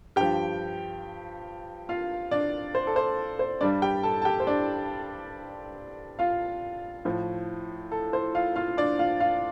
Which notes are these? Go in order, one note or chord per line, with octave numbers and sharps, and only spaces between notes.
G2 F3 G4 G5
F4 F5
D4 D5
C5
A4
C5
C5
G2 G3 D4 D5
G4 G5
A4 A5
A5
G4 G5
C5
D4 D5
F4 F5
A2 F3
A4
C5
F4 F5
F4 F5
D4 D5
F4 F5
F4 F5